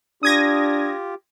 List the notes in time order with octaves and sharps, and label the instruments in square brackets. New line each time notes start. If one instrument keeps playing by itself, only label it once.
[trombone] D4 [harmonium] F4 G4 [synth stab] D#6 G#6 A#6